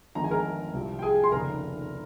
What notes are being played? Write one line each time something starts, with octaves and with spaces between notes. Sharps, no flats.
G1 F2 D#3 G#3 A#5
G#5
A#4 A#5
C2 C3 F3
G5
G#4 G#5
C6
F1 D#2 C#3 A#4 A#5